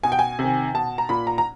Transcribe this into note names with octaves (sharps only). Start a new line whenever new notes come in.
B2 G#5
G5
G#5
C3
D#3
B2 A5
A#5
A#2 B5
A#5
A#5